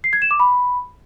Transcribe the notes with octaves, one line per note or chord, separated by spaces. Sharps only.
C7
G#6
E7
D6
B5